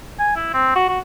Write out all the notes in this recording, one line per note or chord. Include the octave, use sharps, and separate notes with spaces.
G#5
E4
C4
F#4
F#4